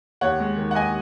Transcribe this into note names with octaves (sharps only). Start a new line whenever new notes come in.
D#2 C#5 F#5
G#3
D#3
F#5
D#2 D#5 G#5